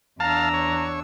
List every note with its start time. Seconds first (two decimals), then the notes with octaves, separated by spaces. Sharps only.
0.20 E2 D4 F5 A5 A#5 E6
0.54 C#5